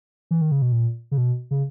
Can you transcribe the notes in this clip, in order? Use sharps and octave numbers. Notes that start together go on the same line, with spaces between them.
E3
D#3
C#3
B2
A#2
C#3
B2
C#3